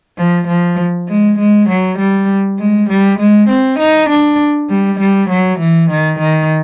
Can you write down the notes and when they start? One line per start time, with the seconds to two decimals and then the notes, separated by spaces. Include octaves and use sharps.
0.18 F3
0.48 F3
1.08 G#3
1.39 G#3
1.69 F#3
1.99 G3
2.59 G#3
2.90 G3
3.19 G#3
3.49 C4
3.79 D#4
4.10 D4
4.70 G3
5.00 G3
5.30 F#3
5.60 E3
5.91 D#3
6.20 D#3